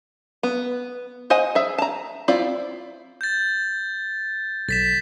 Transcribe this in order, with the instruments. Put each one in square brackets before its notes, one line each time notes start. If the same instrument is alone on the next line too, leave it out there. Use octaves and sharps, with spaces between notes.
[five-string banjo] B3
C5 D#5 F#5 G#5
G#4 E5
A5 A#5
C4 E4 F4 D5
[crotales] G6 A6
[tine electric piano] B1 [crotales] A6 B6 E7